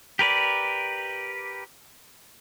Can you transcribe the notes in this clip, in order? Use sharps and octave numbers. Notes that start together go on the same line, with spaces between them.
G4 A#4 B4 D5